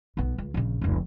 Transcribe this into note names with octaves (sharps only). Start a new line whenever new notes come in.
B1 B3
C#2
A#1 C#3
F1 C#2